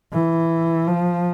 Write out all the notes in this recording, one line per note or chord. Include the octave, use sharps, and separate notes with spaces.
E3
F3